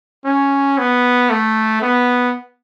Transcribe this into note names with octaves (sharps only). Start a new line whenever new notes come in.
C#4
B3
A3
B3